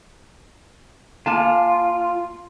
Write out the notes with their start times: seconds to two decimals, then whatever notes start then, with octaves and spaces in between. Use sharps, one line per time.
1.26 A#3 F4 G#5 A5